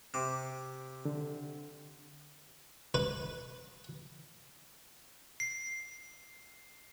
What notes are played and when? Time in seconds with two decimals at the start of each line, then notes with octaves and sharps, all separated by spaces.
0.14 C3 D6
1.05 D3
2.94 B4
5.40 C7